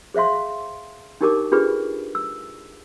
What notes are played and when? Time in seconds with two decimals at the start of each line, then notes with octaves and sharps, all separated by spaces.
0.14 G#4 C5 E5 F5 C6
1.21 D4 D#4 G4 A#4 A5 D6
1.52 D4 F4 G4 G#4 B4
2.15 E6